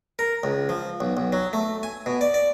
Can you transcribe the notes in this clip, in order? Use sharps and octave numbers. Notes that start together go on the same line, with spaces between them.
A#4
C#2
F3
B1
B1
F#3
A3
G#5
B2
D5
D5